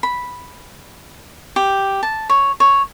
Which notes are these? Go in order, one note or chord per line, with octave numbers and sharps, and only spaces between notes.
B5
G4
A5
C#5
C#5